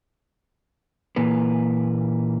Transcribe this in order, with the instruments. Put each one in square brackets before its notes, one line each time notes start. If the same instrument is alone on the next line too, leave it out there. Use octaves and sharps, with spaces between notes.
[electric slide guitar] A#2 E3 A#3 B4